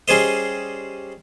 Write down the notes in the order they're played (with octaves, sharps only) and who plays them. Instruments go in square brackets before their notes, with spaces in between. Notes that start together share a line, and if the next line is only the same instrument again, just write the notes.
[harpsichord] G3 C#4 G#4 C5 D#5